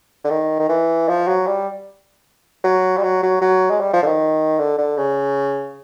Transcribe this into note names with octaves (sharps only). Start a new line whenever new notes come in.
D3
D#3
D#3
E3
F3
F#3
G3
F#3
G3
F#3
F#3
F#3
G#3
G3
F3
D3
D#3
D3
D3
C#3